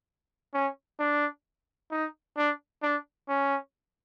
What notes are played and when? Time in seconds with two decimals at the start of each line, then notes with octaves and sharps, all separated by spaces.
0.54 C#4
0.99 D4
1.91 D#4
2.37 D4
2.83 D4
3.29 C#4